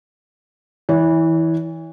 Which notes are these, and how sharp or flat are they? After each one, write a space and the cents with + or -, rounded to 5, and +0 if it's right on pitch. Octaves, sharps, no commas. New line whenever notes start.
E3 -20 C#5 +40